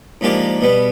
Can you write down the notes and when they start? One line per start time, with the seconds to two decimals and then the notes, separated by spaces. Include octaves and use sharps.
0.21 G#2 F3 A#3 D4 G4
0.61 B2 G3 B3